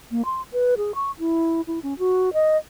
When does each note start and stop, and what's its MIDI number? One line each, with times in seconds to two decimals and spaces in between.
0.11 0.22 58
0.25 0.42 84
0.52 0.75 71
0.77 0.95 68
0.95 1.11 85
1.19 1.61 64
1.67 1.79 64
1.83 1.97 61
1.99 2.33 66
2.33 2.57 75